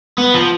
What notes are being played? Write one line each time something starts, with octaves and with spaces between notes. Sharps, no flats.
B3
F3